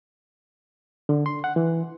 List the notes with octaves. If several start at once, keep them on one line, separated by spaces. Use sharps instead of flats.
D3
C6
F#5
E3